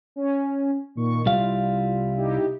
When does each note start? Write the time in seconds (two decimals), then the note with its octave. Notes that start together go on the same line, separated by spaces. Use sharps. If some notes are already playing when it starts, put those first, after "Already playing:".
0.16 C#4
0.95 A#2 D#3 C#6
1.26 C2 G3 E4 F4 F5
2.16 D#4 E4 G4